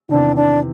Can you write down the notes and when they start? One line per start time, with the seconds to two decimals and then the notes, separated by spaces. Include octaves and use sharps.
0.09 E2 C3 D#3 D4
0.36 D4